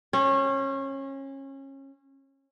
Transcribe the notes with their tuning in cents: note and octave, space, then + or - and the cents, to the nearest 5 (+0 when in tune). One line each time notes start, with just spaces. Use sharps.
C#4 -25 C5 +0